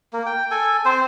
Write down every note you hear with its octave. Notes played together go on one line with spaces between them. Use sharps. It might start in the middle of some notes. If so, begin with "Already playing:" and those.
A#3
G5
A4 G#5
C4 C5